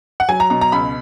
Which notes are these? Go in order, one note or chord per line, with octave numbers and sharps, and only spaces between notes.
F#5
F#3 G#5
A#5
B2 A#5
A#5
C#2 B5